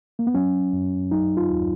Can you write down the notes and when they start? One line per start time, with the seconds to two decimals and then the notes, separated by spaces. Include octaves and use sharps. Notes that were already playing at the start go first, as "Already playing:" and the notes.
0.19 A#3
0.27 B3
0.34 F#3 C#4
0.73 F#2
1.11 F#3 D#4
1.37 F4
1.50 D#2